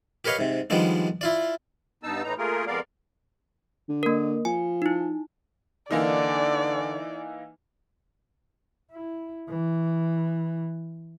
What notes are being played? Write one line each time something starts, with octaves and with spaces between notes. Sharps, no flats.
G4 A#4 B4 C#5 D#5 F5
G#2 C3
D#3 F3 G3 G#3 B3 D4
E4 F4 D5
G2 B3 D#4 A5 E6
A2 E3 D#4 A#5
A3 A#3 F4 G#4 A#4
F2 G#3 B3 A#4 D5 F5
D3
A#3 A#4
F3 G#5
D#4 E4
D3 E3 A#3 D#4 D5
E4
E3